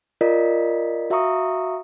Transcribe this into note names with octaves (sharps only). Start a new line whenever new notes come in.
F4 A#4 D5 D#5 B6
F#4 E5 F5 A#5 C#6 D#6